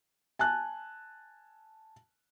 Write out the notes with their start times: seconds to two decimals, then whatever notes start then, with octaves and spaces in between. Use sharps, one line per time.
0.39 G#5 A5 F#6